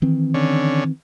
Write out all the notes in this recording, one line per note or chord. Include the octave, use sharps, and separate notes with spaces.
D#3 E3 C4
D3 C#4